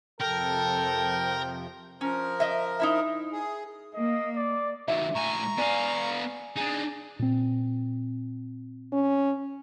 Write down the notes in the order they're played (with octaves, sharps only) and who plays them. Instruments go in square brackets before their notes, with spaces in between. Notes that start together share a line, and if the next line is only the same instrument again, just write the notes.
[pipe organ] F2 C3 F3 [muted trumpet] A4 [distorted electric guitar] A#4 [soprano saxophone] G5
[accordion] F3 A#4 [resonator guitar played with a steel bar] C#4
[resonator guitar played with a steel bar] D#5 E5
D#4 E4 E5
[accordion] G#4
[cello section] A#3 [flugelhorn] D#5
[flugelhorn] D5
[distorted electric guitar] D#3 F#3 [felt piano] E5
[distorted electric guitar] A2 G#5 [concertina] A#5 C#6
[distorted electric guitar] B3 F5 [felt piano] D5 G#5 D#7
[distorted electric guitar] D4 D#4 [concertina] G#4
[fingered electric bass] A#2 C4
[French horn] C#4